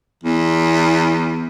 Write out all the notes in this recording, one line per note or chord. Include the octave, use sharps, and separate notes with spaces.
E2